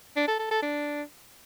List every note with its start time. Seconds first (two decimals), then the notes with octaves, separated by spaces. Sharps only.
0.16 D4
0.28 A4
0.39 A4
0.51 A4
0.62 D4